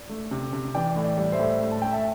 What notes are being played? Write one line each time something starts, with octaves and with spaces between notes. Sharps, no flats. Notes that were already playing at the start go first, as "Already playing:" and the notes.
Already playing: D5
A3
C3
C3
E3 D5 G5
A2
D5
G3
C5 E5
A2
A3
A5
A3 G5
E5 A5